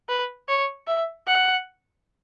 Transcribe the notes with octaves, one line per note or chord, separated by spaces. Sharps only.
B4
C#5
E5
F#5